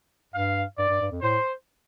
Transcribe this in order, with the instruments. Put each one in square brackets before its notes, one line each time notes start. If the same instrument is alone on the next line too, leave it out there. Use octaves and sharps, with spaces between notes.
[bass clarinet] G2 [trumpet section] F5
[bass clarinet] G2 [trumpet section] D5
[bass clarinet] G2
G2
F2
[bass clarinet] A2 [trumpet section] C5